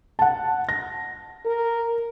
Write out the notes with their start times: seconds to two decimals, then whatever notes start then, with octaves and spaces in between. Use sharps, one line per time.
0.19 F#5 A5
0.69 A#6
1.46 A#4